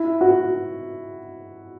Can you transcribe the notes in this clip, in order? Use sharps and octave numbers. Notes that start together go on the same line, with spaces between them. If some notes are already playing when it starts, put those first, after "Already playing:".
Already playing: E4
F#4